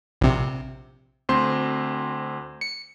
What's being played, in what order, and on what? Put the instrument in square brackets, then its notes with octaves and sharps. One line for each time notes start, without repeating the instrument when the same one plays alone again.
[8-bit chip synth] A#1 C3
[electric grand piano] D2 C4 C6
[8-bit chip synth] C#7